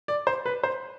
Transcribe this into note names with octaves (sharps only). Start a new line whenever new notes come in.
D5
C5
B4
C5